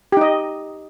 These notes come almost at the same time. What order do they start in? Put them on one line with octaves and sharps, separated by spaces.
G4 D#4 D#5